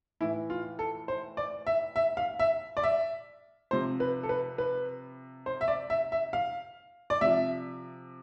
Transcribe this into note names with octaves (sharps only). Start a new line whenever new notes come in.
A2 E3 E4
F4
A4
C5
D5
E5
E5
F5
E5
D5
E5
C3 F3 C5
B4
A4
B4
B4
C5
E5
D5
E5
E5
F5
D5
C3 F3 E5